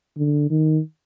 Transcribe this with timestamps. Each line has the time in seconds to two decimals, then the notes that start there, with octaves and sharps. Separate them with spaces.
0.17 D3
0.50 D#3